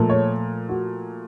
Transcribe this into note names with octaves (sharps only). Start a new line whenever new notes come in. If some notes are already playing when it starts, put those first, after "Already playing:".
Already playing: A#2 F3 A3
C#5
F#4